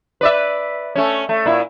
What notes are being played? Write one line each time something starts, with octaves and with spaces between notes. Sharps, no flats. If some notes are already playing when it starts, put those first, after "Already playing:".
B4 D5 E5
A3 C#4
A3
A#2 E4